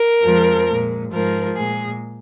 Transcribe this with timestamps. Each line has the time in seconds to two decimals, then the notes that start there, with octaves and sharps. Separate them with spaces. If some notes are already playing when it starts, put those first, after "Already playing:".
Already playing: A#4
0.23 F2 F3 G#3
0.67 A#2 G#3
1.11 G#2 F3 G#3 A#4
1.55 A#2 G#3 G#4